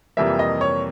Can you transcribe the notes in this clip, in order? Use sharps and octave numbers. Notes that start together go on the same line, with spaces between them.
F2 C3 E3 G3 A#3 E5
D#5
C#5